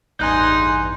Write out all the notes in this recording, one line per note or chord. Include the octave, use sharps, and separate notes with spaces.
A1 E2 G2 D#4 G#5 C6 F#6 G6